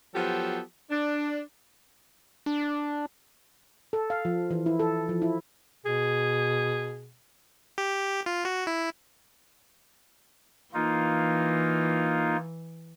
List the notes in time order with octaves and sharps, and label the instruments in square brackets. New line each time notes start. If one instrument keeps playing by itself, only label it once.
[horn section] F3 F#3 B3 G4 A4 C5
D4
[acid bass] D4
[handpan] A4
F5
F3
E3
E4
A4
F3
E4
[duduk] B2 [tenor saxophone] G#4
[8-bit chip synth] G4
F4
F#4
E4
[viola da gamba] E3 [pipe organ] A#3 D#4 F4